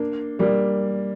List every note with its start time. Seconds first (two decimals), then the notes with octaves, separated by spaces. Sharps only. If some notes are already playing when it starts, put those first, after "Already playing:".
Already playing: A#3 D4
0.39 G3 A#3